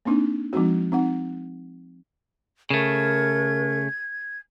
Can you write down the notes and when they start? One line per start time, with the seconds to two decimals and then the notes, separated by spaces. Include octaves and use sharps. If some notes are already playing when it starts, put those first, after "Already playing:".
0.05 A#3 C4 D4 D#4
0.53 F3 G#3 C4 D#4 F#4
0.92 C4 D#4 F#5
2.70 C#3 A3 A#4 G#6